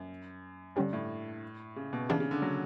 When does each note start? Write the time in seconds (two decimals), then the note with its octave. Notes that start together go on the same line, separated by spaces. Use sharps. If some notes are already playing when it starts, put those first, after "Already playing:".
Already playing: F#2
0.76 G2 D3 G3 C#4 G4
0.93 A2
1.76 C#3
1.93 B2
2.09 C#3 E3 B3 D4
2.20 C#3
2.31 D3
2.42 F#3